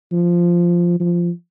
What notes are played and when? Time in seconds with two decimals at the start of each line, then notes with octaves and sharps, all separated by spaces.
0.12 F3
1.00 F3